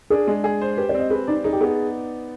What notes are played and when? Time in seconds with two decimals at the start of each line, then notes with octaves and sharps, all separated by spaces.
0.10 D4 G#4
0.27 G#3
0.44 G#4
0.61 C5
0.77 G4 B4
0.89 D5
0.94 C4
1.00 D#5
1.10 G#4 B4
1.27 D#4 D5
1.44 D#4 G#4
1.53 G4
1.61 B3 G#4